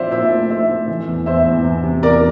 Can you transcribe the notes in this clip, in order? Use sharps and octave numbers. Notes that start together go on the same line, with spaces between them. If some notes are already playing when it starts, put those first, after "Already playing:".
Already playing: F3 C4 C5 D5 E5 F5
A#2 C5 E5
A3
A3 C5 E5
A3
E3
E2
E2 C5 E5
E2
E2
C3
E2 A#4 D5